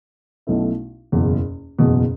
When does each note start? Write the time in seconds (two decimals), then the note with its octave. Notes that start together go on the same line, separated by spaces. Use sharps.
0.47 B1 B2 A3 C#4 E4
1.12 F#1 E2 B2
1.79 F#1 E2 B2